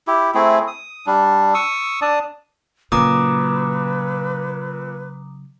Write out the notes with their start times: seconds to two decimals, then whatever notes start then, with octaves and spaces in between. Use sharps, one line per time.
0.07 E4 G4
0.34 A3 C4 E4 G#4
0.67 D#6
1.06 G3 D4
1.54 C#6 D#6 E6
2.02 D4 D5 A5 D#6
2.92 A#2 C#3 F#3 B4 A#5 D6 D#6